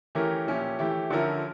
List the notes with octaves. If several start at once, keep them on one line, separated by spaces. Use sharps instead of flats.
E3 A3 C#4 G4 A#4
A#2 F3 C#4 E4 G4
E3 A3 E4 G4
D3 F3 C#4 E4 A#4